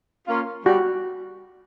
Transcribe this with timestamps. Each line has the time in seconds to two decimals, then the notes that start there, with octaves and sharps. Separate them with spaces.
0.27 A#3 C#4 F4
0.65 G3 F#4